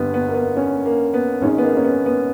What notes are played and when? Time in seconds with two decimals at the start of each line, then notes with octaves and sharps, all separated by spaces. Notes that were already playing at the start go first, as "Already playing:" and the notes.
Already playing: G1 G2 G3 B3
0.14 B3
0.29 A#3
0.34 B3
0.57 C#4
0.85 A#3
1.14 B3
1.41 G#1 G#2 D#3 G#3 C#4
1.58 B3
1.63 A#3
1.77 C#4
1.84 B3
2.06 B3